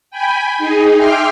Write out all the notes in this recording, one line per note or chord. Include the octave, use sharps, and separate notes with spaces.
G5 G#5 B5
D#4 G#4
E5 G5 C6 D6 F6